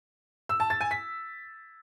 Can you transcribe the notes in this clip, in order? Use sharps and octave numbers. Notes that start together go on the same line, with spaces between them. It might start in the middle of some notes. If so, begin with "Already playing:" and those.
E6
A5
A6
G#5
B6